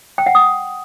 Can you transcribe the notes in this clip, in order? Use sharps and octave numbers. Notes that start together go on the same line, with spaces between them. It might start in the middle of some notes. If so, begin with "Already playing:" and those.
G5
F#5
D#6